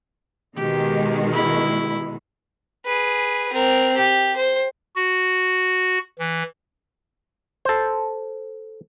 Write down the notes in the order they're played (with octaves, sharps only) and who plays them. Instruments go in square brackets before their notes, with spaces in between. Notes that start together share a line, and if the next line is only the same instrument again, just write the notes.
[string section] B2 D#3 G#3 [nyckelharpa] G4
[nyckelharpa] E4 B5
[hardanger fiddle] G#4 B4
C4 A#4
G4
C5
[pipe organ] F#4
E3
[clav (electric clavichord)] A4 C5